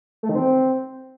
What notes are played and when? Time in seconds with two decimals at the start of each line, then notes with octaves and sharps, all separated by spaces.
0.23 A3
0.29 D#3
0.35 C4